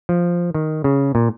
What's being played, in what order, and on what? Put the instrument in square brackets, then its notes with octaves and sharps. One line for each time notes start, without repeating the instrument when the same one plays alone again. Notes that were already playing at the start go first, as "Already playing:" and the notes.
[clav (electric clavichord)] F3
D#3
C#3
A#2